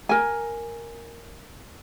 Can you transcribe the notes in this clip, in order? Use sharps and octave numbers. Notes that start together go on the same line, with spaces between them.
A#4 G#5